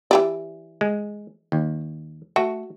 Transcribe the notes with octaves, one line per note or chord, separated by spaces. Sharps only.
E3 G4 D5
G#3
D#2
A3 F#4